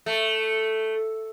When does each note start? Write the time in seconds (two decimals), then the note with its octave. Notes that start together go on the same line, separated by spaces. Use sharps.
0.06 A3